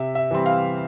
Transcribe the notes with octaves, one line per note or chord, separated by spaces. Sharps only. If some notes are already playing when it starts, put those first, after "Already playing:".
Already playing: C3 E5
E5
E3 G3 C4
F5